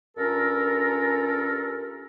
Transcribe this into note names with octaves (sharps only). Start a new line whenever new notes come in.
G2 C#4 F4 A4 A#4